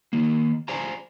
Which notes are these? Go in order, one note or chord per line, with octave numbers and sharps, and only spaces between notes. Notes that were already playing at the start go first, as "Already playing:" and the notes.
D#3 A#3
C5 D5 F5 G#5 A#5